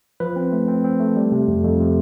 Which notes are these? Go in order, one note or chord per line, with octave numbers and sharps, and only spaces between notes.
F3 B4
C4
A3
C4
C4
A3
G3
C3
F2
F2
C3